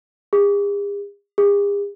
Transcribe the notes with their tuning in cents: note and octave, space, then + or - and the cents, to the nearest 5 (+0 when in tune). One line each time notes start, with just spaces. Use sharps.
G#4 -45
G#4 -45